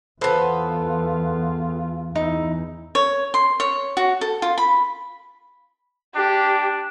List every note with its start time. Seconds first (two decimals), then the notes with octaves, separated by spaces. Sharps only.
0.21 E2 B3 F4 A4 B4 C5 C6
2.15 E2 D#4 E4
2.95 C#5
3.34 C6
3.60 C#5
3.97 F#4
4.21 A4
4.42 F4
4.58 B5
6.15 D4 G4